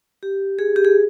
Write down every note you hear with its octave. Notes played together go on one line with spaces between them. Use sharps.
G4
G#4
G4
G#4